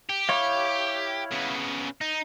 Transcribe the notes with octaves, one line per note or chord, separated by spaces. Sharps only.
G4
E4 C#5 F5
C#3 B3
D#4